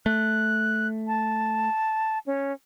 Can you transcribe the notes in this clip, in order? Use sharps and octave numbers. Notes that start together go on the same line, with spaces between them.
A3 F#6
A5
C#4